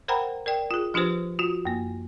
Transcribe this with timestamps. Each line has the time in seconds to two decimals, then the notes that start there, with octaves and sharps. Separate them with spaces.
0.08 A#4 C5 F#5 G5 A#5 B5
0.46 A#4 D5 G5
0.71 F4 G#4
0.94 F3 D4 F4 G4 B4 C5
1.39 F4 F#4
1.65 F#2 A#3